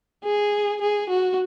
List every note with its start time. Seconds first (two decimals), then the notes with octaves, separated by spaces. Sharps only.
0.24 G#4
0.82 G#4
1.10 F#4